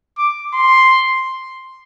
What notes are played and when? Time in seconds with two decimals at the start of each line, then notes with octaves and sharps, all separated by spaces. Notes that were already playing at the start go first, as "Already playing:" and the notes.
0.18 D6
0.54 C6